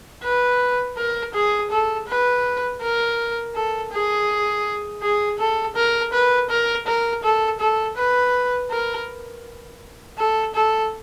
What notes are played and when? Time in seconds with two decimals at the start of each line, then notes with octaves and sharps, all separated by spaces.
0.23 B4
0.97 A#4
1.34 G#4
1.71 A4
2.08 B4
2.82 A#4
3.55 A4
3.92 G#4
5.03 G#4
5.39 A4
5.76 A#4
6.13 B4
6.50 A#4
6.87 A#4
7.23 A4
7.60 A4
7.97 B4
8.71 A#4
10.18 A4
10.55 A4